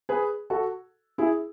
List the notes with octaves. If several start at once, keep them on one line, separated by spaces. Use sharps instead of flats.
G#4 B4
F#4 A4
E4 G#4